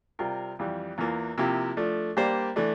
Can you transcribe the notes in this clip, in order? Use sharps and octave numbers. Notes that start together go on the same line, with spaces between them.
C3 G3 C4 F4 A#4
F2 E3 G3
E2 E3 A#3 F4
C3 F3 A#3 E4 G4
F3 A3 D4
G3 A#3 D4 G4 C5
E3 A3 D4